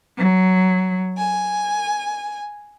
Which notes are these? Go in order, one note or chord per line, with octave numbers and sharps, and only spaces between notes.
F#3
G#5